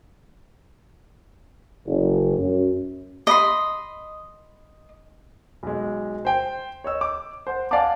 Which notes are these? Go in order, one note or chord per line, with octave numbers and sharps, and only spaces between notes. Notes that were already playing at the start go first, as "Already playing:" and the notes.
F#1
F#2
D#5 B5 C6
B1 G#3
C5 G5
C#5 D#5 E6
D6
C5 F#5
D5 F5 F#5 G#5 A5 D6